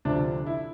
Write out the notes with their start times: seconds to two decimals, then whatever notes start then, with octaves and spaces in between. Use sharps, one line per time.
0.05 D2 C3 F3 D4
0.46 E4